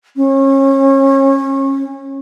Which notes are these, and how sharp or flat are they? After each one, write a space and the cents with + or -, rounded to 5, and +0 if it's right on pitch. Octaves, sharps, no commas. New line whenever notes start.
C#4 -30